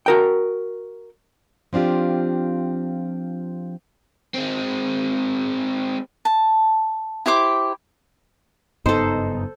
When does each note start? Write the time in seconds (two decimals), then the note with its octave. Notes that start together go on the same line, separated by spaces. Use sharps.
0.06 F#4 A#4 G5
1.73 F3 C4 D4 F4 G4
4.35 G#3 C4
6.25 A5
7.26 E4 G4 C5 D6
8.86 F#1 G2 B3 D#4 A4 C5